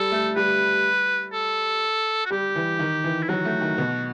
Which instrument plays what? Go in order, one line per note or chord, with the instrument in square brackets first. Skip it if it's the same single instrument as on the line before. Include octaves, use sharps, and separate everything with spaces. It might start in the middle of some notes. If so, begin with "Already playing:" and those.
Already playing: [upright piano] G3 [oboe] A4
[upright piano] A3
[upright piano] G3 [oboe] B4
[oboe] A4
F#4
[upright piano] G3 [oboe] G4
[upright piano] E3
D#3
E3
[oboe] E4
[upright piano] F#3 [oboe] F#4
[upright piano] A3
D#3
B2